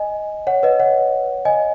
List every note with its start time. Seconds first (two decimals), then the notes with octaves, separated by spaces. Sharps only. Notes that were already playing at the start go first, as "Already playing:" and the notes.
Already playing: D#5 G#5
0.47 C#5 F#5
0.63 B4 D#5
0.80 C#5 F#5
1.45 D#5 G#5